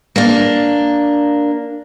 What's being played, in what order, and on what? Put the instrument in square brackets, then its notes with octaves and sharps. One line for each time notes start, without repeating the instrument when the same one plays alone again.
[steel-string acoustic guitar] A#3 D4